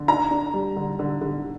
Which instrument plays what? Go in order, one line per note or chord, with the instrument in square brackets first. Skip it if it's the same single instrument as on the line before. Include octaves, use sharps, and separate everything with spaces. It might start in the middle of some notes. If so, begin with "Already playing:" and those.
Already playing: [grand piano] D3
[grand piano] D4 [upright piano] A#5
[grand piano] D4
G3
D3
D3
D3